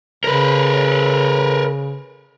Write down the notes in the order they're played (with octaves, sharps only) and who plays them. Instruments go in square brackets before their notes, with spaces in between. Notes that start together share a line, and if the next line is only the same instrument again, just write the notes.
[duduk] C#3 [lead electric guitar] A#4 B4